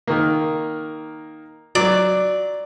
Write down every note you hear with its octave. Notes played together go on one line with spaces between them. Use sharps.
D#3 A#3
F#3 D5